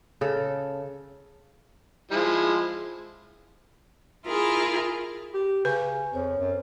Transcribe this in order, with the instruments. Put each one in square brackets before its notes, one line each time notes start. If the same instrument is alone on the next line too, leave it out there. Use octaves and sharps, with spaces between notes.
[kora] C#3 A4
[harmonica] F3 G#3 E4
[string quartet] E4 F4 G#4 A#4
[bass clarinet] G4
[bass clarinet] C#3 [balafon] B4 [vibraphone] G#5
[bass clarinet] F2 [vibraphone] C5 C#5
[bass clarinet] F#2